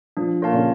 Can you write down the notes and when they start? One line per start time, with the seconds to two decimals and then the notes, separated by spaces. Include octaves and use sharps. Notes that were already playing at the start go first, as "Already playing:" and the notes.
0.17 F3 D4
0.41 A#2 A#3 F4 C#5 F5 A5
0.54 C#3 C#4